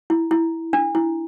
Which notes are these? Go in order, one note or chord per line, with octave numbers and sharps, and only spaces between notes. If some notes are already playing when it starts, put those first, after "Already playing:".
E4
E4
D4
E4